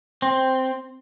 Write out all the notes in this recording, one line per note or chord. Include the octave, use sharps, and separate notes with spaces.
C4